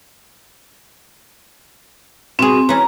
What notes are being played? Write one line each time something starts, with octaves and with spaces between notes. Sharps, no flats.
B2 C4 G#4
E3 C#4 A#5